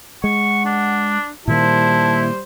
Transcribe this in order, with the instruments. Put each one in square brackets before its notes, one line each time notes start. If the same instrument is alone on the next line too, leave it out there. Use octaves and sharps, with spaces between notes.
[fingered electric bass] G#3 [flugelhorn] F#5 [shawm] C#6
[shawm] D4
[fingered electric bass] A#2 D#3 A#3 [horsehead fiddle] G3 C5 [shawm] E4 [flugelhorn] A5